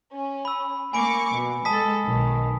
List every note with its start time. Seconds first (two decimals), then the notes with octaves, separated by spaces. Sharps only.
0.14 C#4
0.45 B5 E6
0.93 A#3 G#5 B5 C#6 D6 D7
1.34 B2
1.65 G#3 A4 A5 D#6 B6
2.04 B1 D#3